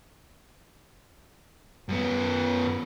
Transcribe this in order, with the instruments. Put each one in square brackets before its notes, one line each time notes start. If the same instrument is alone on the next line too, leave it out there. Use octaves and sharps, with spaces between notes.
[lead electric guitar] F#2 B3